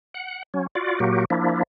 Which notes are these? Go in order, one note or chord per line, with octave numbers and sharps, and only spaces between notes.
F#5
F#3 C#4
F4 F#4 D5
A#2 F#3 A#3 F#4 G4
F3 A#3 D4 E4